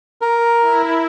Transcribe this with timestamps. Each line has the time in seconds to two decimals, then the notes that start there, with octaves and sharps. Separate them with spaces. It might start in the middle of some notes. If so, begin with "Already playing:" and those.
0.21 A#4
0.62 E4